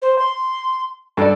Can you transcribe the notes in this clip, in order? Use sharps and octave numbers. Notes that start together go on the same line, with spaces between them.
C5
C6
G2 A4 D5